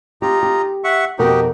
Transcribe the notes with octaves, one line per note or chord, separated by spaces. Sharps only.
D#4 F4 G4 A#5
G4
E5 F#5 C#6
F2 B2 D#4 F#4 G4 A#4